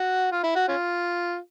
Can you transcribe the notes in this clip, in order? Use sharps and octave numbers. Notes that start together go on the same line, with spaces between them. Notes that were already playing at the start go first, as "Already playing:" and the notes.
Already playing: F#4
F4
E4
F#4
C#4 F4